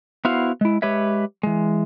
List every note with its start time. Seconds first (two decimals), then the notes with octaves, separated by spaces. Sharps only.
0.25 B3 E4 F#4 C5 F5
0.61 G#3 E4
0.82 G#3 G4 B4 C#5 E5
1.43 E3 G#3